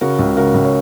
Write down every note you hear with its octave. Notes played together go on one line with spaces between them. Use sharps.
C#3 F#4 A#4
C#2
C#3 F#4 A#4
C#2
C#5